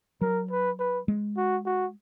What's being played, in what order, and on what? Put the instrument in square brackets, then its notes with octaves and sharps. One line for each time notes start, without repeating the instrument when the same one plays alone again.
[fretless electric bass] F#3 [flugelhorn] A#4
[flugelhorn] B4
B4
[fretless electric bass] G#3
[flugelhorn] F#4
F#4